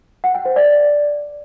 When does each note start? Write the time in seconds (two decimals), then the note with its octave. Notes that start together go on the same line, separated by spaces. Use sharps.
0.24 F#5
0.35 G5
0.45 C5
0.56 D5